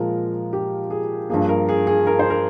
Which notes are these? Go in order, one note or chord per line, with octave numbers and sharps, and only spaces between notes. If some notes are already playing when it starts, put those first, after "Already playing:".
Already playing: A#2 F3 G#3 A#4
G4
G#4
G2 F3 A#3 G#4
A#4
G#4
G#4
A#4
C5
A#4